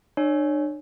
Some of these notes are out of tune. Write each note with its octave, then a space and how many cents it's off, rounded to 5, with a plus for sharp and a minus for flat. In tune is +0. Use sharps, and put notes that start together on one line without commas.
D4 +40 C#5 +0